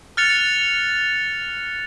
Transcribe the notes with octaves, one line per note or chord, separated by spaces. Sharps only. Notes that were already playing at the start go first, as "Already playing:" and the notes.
F6 F#6 A6 C#7 F7